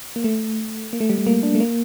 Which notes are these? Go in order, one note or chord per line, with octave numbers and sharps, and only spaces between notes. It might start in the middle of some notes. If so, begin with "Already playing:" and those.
A#3
A3
A#3
A3
G3
A3
A#3
D4
A3
A#3